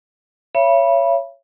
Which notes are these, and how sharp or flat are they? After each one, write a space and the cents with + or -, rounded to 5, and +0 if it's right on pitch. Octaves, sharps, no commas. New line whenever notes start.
C#5 +0 E5 +45 B5 -20